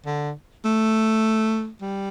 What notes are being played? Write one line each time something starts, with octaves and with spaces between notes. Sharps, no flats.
D3
A3
G3